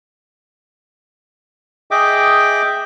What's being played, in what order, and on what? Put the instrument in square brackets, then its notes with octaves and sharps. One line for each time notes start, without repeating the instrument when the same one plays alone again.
[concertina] G#4 D#5 E5 G5 D6